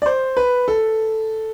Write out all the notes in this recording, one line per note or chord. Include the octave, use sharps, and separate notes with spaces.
D5
C5
B4
A4